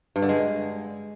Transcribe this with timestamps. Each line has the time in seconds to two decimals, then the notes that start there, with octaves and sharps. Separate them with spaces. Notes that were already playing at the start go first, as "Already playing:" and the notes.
0.16 G2
0.22 D3
0.29 G#3